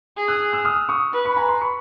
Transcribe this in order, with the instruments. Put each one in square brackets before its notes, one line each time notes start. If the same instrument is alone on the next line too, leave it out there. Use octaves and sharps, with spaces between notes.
[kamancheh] G#4
[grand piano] E6 F#6
E6 F#6
D#6 F6
C#6 D#6
[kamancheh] B4
[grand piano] B5 C#6
G#5 A#5
A#5 C6
B5 C#6